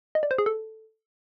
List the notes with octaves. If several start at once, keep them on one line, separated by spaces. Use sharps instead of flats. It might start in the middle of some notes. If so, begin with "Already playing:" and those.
D#5
D5
C5
G#4
A4